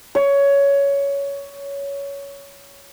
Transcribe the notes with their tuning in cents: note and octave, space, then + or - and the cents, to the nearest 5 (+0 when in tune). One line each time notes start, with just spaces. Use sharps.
C#5 +15